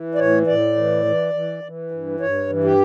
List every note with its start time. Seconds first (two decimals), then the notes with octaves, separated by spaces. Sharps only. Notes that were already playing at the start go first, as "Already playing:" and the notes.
Already playing: E3
0.15 D5
0.18 A2 C#5
0.47 A2 D5
0.76 E3
1.05 E3
1.34 E3
1.63 E3
1.91 G2
2.20 G2 C#5
2.49 E3
2.64 G4